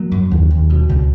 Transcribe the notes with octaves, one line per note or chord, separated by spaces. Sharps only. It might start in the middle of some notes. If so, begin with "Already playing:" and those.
Already playing: F#3 A#3
F#2
D#2
D#2
B2
C#2